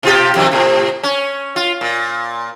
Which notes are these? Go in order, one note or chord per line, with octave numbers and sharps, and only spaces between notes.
B2 F4 G4
F2 C3 D#3
A2 C3
C#4
F4
A#2